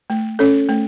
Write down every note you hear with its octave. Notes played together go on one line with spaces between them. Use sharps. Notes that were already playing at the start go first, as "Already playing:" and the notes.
A3
C#4 A4 C#5
A3